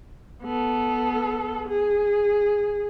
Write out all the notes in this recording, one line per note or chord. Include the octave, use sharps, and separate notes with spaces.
B3 A4
G#4